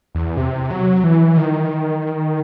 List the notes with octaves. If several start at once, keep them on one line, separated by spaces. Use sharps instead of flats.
E2
C3
F#3
E3
D#3